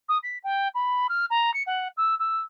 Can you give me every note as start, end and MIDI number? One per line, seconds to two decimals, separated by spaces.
0.09 0.18 87
0.23 0.38 95
0.43 0.68 79
0.74 1.07 83
1.09 1.25 89
1.30 1.53 82
1.54 1.63 97
1.66 1.88 78
1.97 2.15 88
2.19 2.40 88